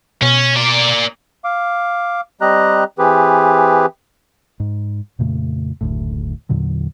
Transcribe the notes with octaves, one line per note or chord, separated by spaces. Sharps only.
B2 C#4
A#3 D5
F5 D6
G3 C4 G4 D#5 A#5 F#6
E3 C4 G4 G#4 B4
G#2
F2 A#2 C#3 A3
F#1 D2 A2
E2 A#2 D3 F#3